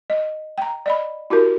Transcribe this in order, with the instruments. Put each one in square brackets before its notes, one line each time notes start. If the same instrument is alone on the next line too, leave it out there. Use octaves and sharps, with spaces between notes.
[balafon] D#5
G5 A#5
D5 D#5 B5
E4 F#4 G4 A#4